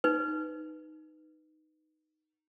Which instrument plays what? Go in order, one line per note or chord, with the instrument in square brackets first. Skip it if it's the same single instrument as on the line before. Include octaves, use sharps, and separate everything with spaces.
[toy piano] D#4 B4